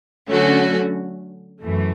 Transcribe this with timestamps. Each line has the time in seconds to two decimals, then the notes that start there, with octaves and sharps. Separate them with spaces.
0.29 D3 F#3 A3 C#4 F#4
1.62 F#2 E3 A3